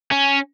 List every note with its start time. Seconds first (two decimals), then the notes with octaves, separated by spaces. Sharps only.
0.11 C#4